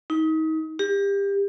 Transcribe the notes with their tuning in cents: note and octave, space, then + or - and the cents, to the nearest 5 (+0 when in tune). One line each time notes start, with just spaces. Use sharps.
D#4 +30
G4 +25